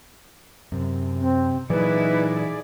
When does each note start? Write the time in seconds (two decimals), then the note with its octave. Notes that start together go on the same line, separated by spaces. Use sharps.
0.72 F#2 C3
1.21 C4
1.70 A#2 E3 F#3 D#4 E4 G#4 B4 D5